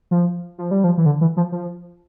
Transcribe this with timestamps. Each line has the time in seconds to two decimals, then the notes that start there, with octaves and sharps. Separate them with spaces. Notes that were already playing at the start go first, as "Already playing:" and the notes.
0.11 F3
0.58 F3
0.71 G3
0.84 F3
0.98 E3
1.06 D3
1.21 E3
1.37 F3
1.52 F3